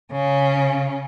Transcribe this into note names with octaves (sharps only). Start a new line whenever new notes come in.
C#3 C#4